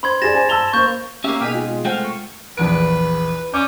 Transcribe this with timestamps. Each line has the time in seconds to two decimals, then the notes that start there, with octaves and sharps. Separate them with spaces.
0.03 C5 B5 C6 G#6
0.22 G4 G#4 D5 A6 A#6 E7
0.34 C5 G#5
0.49 A5 E6 E7 F7 G7
0.73 A#3 C5 C#6 G6
1.24 A#3 C#4 G4 E5 F5 D6
1.41 B2 D#4 G#4 G5 F6 B6 D#7
1.54 G#3 F4
1.85 C3 G#3 A3 C4 F4 F#5 G5 F6
2.03 C#6
2.57 A#1 E2 B4 D7
3.54 C#4 D5 D6 G6